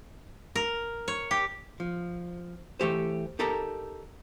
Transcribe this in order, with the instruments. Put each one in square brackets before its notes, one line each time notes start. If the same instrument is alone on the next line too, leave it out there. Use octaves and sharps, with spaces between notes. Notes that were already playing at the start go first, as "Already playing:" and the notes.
[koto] A#4
C#5
G4
[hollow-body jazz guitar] F3
E3 A3 G4 C5
D#4 G4 A4 A#4 A#5